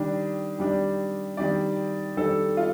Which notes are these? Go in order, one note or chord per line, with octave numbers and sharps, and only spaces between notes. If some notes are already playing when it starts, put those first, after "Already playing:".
Already playing: D#3 G3 D4
D#3 G3 D4
D#3 G3 D4 D5
D#3 G3 D4 A4
F4